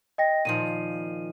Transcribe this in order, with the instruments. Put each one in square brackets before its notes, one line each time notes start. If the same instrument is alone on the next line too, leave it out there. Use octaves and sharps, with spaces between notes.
[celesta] D#5 G5 A#6
[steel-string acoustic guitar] A#2 D#3 F3 [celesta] D#7